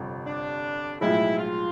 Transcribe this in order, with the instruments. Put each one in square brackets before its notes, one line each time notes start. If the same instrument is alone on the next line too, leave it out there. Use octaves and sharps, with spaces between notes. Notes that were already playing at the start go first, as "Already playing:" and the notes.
Already playing: [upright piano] G1 F2 C3
[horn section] D4
[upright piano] B1 A2 F3 G#3 [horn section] E4
[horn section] F4